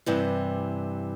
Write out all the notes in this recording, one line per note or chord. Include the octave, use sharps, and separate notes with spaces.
G2 C3 E3